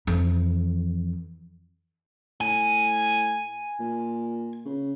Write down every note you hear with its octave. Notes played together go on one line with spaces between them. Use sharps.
F2 E3
A2 G#5
A#2
C#3